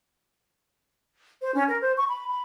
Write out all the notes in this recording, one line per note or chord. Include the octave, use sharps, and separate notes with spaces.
C5
C#4
A#4
C5
C#6
B5
B5